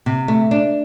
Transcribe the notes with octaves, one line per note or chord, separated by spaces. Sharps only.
C3
A3
D4